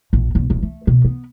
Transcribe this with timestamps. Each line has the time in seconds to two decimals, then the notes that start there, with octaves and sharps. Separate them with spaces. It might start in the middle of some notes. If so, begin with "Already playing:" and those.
0.13 A#1
0.35 B1
0.50 D#1
0.63 A3
0.87 B2
1.05 B3